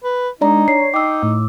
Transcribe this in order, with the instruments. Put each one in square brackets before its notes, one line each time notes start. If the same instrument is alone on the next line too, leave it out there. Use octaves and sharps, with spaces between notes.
[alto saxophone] B4
[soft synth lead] G#3 [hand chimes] D4 D5 A#5 [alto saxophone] D#4
[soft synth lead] C#5 [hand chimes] C7
[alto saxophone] D#4 [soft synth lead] G5 [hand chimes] D6 E6
[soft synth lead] A2